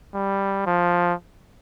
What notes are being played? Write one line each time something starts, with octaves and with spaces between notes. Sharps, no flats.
G3
F3